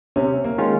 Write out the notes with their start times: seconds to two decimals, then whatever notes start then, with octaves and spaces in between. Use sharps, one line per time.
0.16 C3 C#4
0.44 A#3
0.58 D#3 G#3 C#4 F4